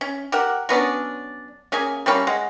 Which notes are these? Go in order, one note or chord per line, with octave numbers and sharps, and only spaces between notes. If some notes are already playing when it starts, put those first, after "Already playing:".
C#4
G4 A#4 F#5
F#3 B3 C#4 D4
A#3 C#4 G#4 G#5
G3 A#3 C#4 B5
G#3 F#5